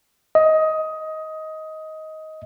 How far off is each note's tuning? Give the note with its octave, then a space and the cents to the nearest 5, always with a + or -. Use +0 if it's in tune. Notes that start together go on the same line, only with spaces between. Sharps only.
D#5 +15